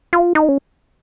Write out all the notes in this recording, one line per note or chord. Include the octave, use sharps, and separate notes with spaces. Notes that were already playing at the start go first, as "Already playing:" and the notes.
F4
D#4
C#4